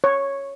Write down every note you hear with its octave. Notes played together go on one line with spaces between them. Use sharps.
C#5